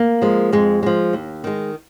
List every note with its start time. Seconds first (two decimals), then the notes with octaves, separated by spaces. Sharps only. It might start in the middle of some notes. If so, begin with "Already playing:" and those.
Already playing: A#3
0.22 F3 G#3
0.52 F2 G#3
0.83 F3 G#3
1.13 D#2
1.44 D#3 G#3